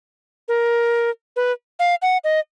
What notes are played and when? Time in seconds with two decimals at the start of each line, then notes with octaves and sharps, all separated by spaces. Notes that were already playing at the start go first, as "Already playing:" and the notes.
0.48 A#4
1.36 B4
1.80 F5
2.02 F#5
2.24 D#5